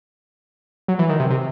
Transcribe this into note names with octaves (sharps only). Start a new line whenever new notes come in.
F#3
E3
D#3
C3
C3